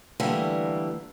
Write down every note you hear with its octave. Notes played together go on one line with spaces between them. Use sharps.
D3 E3 G3 A3 A#3